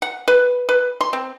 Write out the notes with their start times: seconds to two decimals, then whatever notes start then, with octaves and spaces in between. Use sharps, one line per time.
0.02 F#5
0.28 B4
0.69 B4
1.01 C6
1.13 C4